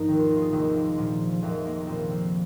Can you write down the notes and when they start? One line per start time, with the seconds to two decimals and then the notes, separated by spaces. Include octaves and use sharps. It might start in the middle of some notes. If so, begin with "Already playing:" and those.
Already playing: A#1 G#2 D#4
0.08 D#2 D#3
0.19 F4
0.30 D#4
0.36 F4
0.42 G#4
0.52 F1 D#2 D#3 G#4
0.64 C4
0.75 A#3
0.86 G#3
0.98 A#1 A#2 F3
1.33 F3
1.42 F1 F2 C3 D#3 G#3
1.65 A#3
1.80 A#3
1.87 A#1 A#2 F3 C4
2.10 C4